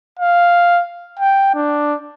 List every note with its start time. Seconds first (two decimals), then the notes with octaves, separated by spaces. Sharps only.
0.19 F5
1.19 G5
1.54 D4